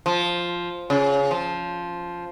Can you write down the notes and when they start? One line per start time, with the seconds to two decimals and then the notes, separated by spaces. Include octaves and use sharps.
0.06 F3
0.90 C#3
1.31 F3